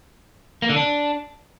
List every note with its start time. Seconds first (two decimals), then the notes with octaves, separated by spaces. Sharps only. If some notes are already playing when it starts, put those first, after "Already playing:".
0.62 A#3
0.69 D3
0.76 D4